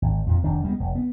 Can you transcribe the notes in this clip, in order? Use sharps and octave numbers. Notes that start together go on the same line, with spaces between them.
G#1
F2 A#2 F3
F1 D#3 D4
G3 G#3 A#3 B3
F1
B3